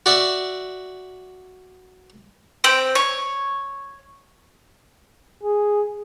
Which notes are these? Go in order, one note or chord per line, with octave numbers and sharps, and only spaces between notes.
F#4 D5 E5
C4 G5
C#5
G#4